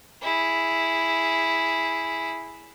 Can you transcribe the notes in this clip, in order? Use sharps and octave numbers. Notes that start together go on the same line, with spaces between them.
E4 G#4